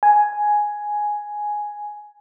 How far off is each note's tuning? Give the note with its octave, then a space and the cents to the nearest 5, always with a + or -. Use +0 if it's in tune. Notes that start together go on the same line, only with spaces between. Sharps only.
G#5 +5